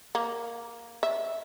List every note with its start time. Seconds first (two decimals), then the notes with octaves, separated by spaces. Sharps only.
0.15 A#3
1.03 E5